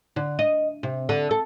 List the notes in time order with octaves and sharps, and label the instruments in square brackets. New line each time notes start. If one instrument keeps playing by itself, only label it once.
[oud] D3
D#5
C3
D3
A4